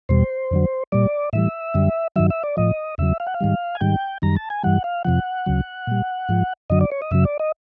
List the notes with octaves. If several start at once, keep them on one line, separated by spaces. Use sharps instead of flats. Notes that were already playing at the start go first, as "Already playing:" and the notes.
E2 B2 G3 C5
F2 D3 F#3
A#2 G3 D5
A2 E3 G3 E5
F#2 D3 G3
G2 D#3 F#3 E5
E5
D5
A2 F3 D#5
E2 C#3 F#3 E5
F5
F#5
F5
G#2 D#3 G3
G#5
G#2 D#3 G3 G5
F#2 D#3 G3 A#5
A5
G#5
G2 E3 G3 F#5
F5
F2 C3 F3 F#5
D2 C#3 F#3
A#2 G3
G#2 F3
F#2 D3 F#3 D#5
D5
C#5
D#5
F#2 C#3 F#3 E5
D5
D#5